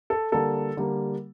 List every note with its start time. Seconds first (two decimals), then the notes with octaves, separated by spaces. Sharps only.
0.10 A4
0.32 D3 G3 A#3 A4
0.77 D3 G3 A#3